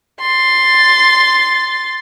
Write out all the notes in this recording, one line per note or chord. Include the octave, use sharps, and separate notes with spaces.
C6 A6